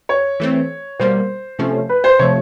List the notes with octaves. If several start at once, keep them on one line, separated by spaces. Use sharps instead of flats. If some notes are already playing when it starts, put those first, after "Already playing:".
C#5
E3 A3 C4
B2 G3 A#3 C5
C3 F3 A3 C#4
B4
C5
C3 F3 A3 C#5